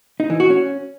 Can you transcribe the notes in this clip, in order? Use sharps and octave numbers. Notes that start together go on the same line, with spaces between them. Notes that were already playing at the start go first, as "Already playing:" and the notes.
D#4
E3
F#4
C#4